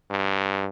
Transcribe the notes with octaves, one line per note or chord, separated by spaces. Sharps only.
G2